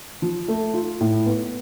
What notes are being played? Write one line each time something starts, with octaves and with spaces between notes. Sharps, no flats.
F3
A3
F4
A2
B3